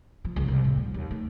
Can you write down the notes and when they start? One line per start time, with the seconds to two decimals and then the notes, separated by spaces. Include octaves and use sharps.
0.25 F3
0.36 C#2
0.48 C2
0.64 A2
0.77 F3
0.94 D#2
1.11 A3